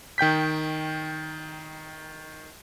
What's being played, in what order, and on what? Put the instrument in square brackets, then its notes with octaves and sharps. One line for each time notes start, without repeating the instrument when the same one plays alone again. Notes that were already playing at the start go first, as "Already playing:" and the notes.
[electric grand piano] D#3 G5 G6 B6